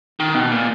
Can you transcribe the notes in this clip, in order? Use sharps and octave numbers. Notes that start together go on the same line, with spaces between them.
D#3
B2
A#2